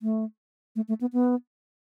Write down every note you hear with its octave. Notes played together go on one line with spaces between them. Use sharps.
A3
A3
A3
B3
B3